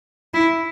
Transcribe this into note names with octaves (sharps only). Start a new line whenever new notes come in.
E4